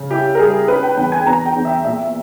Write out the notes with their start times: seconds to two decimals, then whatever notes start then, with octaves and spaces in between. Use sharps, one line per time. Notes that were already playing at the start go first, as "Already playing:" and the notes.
Already playing: C#3
0.10 E4 G4
0.35 A#4
0.39 G3 G#4
0.68 C#4 B4
0.83 G5
0.97 E2 G5
1.12 G#5
1.26 E2 A#5
1.46 G5
1.56 E2
1.65 E5
1.85 A#2 E5